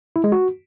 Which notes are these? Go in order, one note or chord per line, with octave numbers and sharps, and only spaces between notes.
E4
G#3
F#4